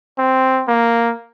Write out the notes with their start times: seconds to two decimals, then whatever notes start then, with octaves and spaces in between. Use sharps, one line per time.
0.18 C4
0.68 A#3